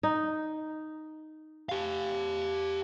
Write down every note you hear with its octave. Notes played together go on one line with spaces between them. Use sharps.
D#4
G4 F5